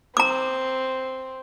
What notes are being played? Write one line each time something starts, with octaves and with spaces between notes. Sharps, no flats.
C4 A#5 D6